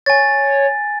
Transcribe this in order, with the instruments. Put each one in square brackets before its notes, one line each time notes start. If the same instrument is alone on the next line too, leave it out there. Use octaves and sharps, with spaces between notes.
[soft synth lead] C#5 [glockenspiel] G#5 A6